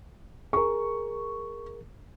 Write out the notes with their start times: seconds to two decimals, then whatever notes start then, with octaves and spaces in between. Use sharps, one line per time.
0.53 G#4 A#4 C#6